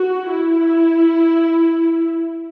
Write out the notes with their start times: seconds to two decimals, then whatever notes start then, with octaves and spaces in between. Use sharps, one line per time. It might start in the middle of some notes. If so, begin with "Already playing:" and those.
Already playing: F#4
0.31 E4